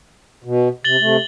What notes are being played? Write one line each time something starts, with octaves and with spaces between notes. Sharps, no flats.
B2
C3 A6 F#7 G7
C3 A3